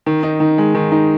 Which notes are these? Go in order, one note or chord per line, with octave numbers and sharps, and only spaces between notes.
D#3
D#4
D#3
G#3
D#3
D#4